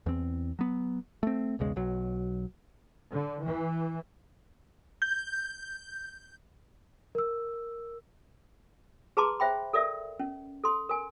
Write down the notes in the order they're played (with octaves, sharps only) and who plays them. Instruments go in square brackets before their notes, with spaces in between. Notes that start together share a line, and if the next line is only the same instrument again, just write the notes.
[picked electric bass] E2 C4
F#3 B3
A3 C4
B1 E2 C#3 G#3
B1 F#3
[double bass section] D3
E3
[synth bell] G6
[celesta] A#4 E6
[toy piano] G#4 B4 A5 A#5 C6 D6
C5 E5 G5 B5
A4 A#4 D5 E5
C#4
A4 C6
A#4 G#5